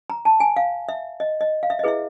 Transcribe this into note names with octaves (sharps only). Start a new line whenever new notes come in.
A#5
A5
G#5
F5
E5
D#5
D#5
F5
E5
D#5
E4 G#4 B4 E5